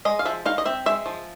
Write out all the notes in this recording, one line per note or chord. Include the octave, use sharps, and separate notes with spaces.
G#3 D#5
F5
F3 E5
D#4 F5
D#5
C4 E5
G#3 E5
F3